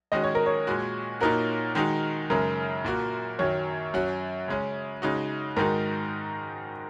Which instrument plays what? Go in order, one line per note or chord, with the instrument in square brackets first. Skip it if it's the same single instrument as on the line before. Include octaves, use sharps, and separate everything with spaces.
[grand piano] D#3 G#3 C#4 F#4 [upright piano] D#5
[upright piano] C#5
A#4
C#5
[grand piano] A#2 G#3 F#4
[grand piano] A#2 A#3 D#4 F#4 [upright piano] A#4
[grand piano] D#3 G#3 D#4 F#4
[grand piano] F#2 C#3 G#3 [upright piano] A#4
[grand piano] A#2 A#3 F#4
[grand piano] F#2 D#3 F#3 [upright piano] C#5
[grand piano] F#2 F#3 C#4 F#4
C#3 G#3 C#4
C#3 G#3 D#4 F#4
[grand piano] G#2 D#3 G#3 D#4 F#4 [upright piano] A#4